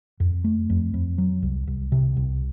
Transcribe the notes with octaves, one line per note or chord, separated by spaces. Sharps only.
F2
A3
F2
F2
F#3
C2
C2
C3
C2